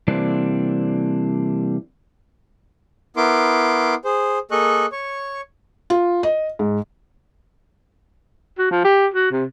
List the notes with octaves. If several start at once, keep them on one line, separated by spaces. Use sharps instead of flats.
C3 E3 G3 A#3 C4 D4
B3 E4 A#4 C6 D6
G#4 C5
A#3 G#4 A4 D#5 C#6 F#6
C#5 C#6
F4
D#5
G#2
F#4
F3
G4
F#4
C3